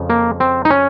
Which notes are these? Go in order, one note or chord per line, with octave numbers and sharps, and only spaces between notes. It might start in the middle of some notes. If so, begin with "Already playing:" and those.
Already playing: F2 C#3 F3
A#3
C4
D#4
C#4